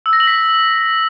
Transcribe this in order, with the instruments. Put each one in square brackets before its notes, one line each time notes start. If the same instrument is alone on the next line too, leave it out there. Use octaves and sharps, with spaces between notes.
[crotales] E6
A#6
F#7
B6